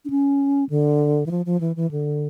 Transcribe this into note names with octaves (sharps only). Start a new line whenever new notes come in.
D4
C#4
D3
E3
F3
F3
E3
E3
D3